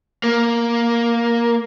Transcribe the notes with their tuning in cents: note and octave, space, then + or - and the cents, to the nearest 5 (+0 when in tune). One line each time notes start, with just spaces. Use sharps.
A#3 +5